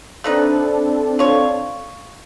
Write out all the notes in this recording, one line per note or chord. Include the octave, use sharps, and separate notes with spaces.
A3 C4 D4 D#4 A4 B4
F4 C#5